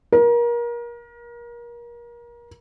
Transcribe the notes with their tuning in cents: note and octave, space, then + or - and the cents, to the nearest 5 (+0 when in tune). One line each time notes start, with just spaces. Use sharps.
A#4 +30